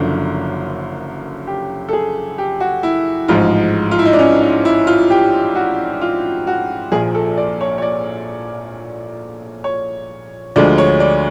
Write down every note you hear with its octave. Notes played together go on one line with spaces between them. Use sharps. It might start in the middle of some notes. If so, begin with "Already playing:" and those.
Already playing: F#1 F#2 D3 F3
G4
A4
G#4
G4
F#4
E4
A1 G#2 F3 G#3 F4
F4
E4
D#4
D4
C#4
D#4
E4
F4
G4
F#4
F4
F#4
A#1 A#2 F3 G#4
A4
D5
C#5
C#5
D5
C#5
D2 D3 F3 G#3 D5
C#5
D5